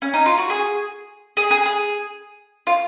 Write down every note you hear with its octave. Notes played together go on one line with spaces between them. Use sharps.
C#4
D#4
F4
F#4
G#4
G#4
G#4
G#4
F4